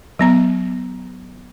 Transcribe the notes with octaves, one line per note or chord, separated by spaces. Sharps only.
F#3 B3 A#5